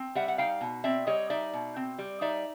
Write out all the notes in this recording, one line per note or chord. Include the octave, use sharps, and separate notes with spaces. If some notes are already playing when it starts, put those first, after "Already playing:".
Already playing: C4
G3 E5 F#5
F#5
D#4 F5 G5
B2
C4 D5 E5
G3 C#5 D#5
D#4 D5 E5
B2
C4
G3
D#4 D5 E5